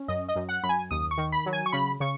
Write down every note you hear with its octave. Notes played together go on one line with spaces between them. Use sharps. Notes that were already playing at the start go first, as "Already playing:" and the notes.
Already playing: C#4
F#2 D#5
D#5
F#2
F#5
F#2 B5
G#5
D#2 D#6
C#6
D#3
B5
F#3
G#5
C#6
C#3 B5
C#3 C#6